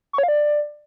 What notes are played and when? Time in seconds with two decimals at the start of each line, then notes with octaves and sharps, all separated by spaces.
0.13 C#6
0.18 C#5
0.23 F5
0.28 D5